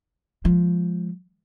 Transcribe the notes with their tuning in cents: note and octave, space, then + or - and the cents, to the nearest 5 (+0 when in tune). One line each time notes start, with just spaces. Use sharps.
F3 +0 G#3 +0